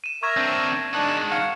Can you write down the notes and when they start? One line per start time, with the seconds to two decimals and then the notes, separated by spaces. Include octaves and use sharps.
0.04 D#7 E7
0.23 A#4 E5 A#5 C#6 G#6 E7
0.37 C4 D4
0.94 D#3 G#3 D4 A5 F#6
1.31 F5 F#5